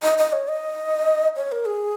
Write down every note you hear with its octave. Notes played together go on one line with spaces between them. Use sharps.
D#5
D#5
C#5
D#5
C#5
A#4
G#4